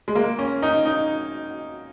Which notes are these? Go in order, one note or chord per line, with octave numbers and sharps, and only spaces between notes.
G#3
A#3
C#4
D#4
D#4